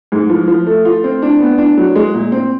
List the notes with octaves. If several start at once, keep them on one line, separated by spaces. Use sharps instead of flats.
G#2
F3
F3
A3
F4
C4
D4
B3
D4
F#3
G#3
A#2
C4